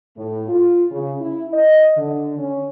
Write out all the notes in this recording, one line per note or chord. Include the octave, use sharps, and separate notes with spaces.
A2
F4
C#3
E4
D#5
D3
C#4